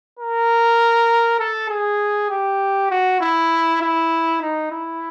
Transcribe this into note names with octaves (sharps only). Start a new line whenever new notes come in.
A#4
A4
G#4
G4
F#4
E4
E4
D#4
E4